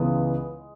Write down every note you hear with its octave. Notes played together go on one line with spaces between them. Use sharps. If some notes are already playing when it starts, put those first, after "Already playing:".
Already playing: C#2 C#3 E3 G#3 B3